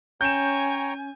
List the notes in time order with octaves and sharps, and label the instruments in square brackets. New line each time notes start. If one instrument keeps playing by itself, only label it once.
[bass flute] C#4 [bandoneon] C#5 G5 A#5 [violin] G#5 [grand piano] G6 E7